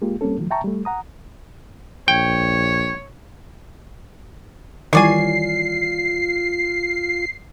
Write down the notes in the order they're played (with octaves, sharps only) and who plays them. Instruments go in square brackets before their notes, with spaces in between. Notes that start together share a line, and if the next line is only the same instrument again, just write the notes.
[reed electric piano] G#3 A#3 F4 G4
G3 A#3 C4 C#4 A4
D#3 F3 F#3 A3
E5 G5 A5 A#5 C#6
G3 A3
F#5 A#5 D#6
[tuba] A#1 [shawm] C#5 [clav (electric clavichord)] G5
[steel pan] D#3 E3 G3 [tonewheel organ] F4 [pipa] C#5 D5 G#5 [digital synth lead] C7